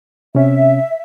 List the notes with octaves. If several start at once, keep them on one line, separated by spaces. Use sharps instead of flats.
C3 C#4 E5